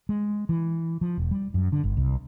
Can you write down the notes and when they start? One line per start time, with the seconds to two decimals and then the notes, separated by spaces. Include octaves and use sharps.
0.09 G#3
0.49 E3
1.01 F3
1.17 E1
1.31 G3
1.54 F#2
1.72 D3
1.84 G1
1.97 C2